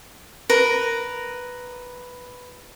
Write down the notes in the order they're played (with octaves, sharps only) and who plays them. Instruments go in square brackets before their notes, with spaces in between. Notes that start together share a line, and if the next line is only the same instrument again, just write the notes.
[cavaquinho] A#4 B4